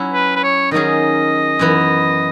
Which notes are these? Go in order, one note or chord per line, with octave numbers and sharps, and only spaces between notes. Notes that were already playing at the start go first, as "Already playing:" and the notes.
Already playing: F#3 C#4 E4
B4
B4
C#5
D#3 F#3 C#4 G#4 D#5
F#2 E3 B3